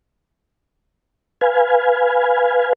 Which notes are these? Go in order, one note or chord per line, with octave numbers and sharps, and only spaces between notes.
B4 F5 G#5